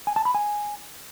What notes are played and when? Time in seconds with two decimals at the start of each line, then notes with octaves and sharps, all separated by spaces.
0.07 G#5
0.16 A5
0.25 B5
0.34 G#5